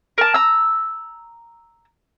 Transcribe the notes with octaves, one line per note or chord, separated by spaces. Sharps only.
A#4 A5
A#5 E6